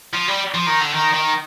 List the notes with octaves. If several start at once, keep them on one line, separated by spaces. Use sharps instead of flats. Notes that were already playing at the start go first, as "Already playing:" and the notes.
F3
G3
F3
D#3
D3
D#3
D#3